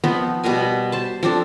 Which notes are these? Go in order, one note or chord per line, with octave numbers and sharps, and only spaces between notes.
F3 B3 C4 D#4
B2 G3 A#4 G#5
C5 A5
F3 C4 D4 A4